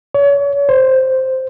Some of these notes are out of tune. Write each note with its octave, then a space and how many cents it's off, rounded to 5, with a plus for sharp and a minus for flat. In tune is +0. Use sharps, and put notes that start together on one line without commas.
C#5 +35
C5 +0